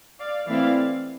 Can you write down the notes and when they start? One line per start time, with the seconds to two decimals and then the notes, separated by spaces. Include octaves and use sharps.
0.19 D5 F5
0.47 E3 A3 C4 E4 D5 F5